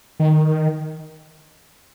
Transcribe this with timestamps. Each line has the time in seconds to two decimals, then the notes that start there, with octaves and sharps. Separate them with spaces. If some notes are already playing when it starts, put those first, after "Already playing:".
0.20 D#3